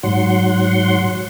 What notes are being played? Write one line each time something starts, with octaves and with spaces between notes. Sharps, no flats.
G#2 F#3 F#5 C6